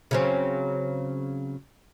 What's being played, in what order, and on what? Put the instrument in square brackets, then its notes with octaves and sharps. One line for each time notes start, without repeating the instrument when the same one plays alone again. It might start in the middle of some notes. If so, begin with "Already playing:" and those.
[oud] C#3 F#3 C4